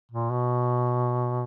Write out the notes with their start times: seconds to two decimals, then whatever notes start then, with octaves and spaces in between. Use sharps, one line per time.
0.12 A#2
0.32 B2